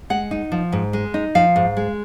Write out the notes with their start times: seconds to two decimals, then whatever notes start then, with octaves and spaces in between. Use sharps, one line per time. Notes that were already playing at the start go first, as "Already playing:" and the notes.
0.10 G#3 F#5
0.31 D#4
0.52 F3
0.72 G#2
0.93 G#3
1.14 D#4
1.35 F3 F5
1.56 G#2
1.77 G#3